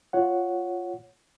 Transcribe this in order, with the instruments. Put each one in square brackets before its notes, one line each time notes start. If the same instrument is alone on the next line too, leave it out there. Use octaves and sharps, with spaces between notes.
[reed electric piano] F4 C#5 F#5